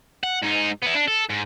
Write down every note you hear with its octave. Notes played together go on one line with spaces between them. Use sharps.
F#5
G#2 D#4
B3 E4
D4
A4
G#2